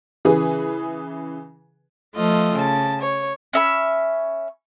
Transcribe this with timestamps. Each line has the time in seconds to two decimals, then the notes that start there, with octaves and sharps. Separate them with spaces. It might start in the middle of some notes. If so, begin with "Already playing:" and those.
0.25 C#3 E3 G#4 B4
2.16 F3 A3 F4 D#5
2.55 C#3 A5
3.01 C#5
3.53 C#4 E5 B5